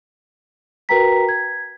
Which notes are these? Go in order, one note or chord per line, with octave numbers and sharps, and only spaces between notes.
F#4 A#4 B4 G5 A#5 B6
G#6